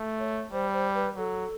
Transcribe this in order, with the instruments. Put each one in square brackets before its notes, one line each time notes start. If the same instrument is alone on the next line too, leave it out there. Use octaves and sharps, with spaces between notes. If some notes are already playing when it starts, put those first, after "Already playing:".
Already playing: [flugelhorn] A3
[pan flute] C#5
[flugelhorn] G3 [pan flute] C5
[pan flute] C5
B4
[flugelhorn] F#3 [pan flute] A4